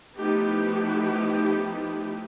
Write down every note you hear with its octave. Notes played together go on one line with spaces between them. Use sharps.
F3 A3 B3 D#4 E4 G4